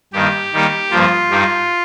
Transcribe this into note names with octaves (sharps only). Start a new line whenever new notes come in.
G2 D#3 A#3 D#4 G4
D#3 G3 A#3 D#4
G2 F3 A#3 F4
G2 G3 D#4